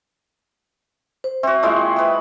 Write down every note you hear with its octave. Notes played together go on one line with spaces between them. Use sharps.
C5
C4 F#4 E5
A#2 G#3 E4
G#4 B4 E5